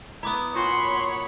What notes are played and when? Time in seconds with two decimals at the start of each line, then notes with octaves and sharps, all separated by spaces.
0.23 B3 E4 A#5 D6 D#6
0.55 A#2 F#4 C#5 F#5 B5 C6